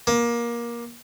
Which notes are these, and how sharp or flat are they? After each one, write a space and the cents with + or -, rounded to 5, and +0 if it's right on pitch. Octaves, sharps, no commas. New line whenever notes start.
A#3 +20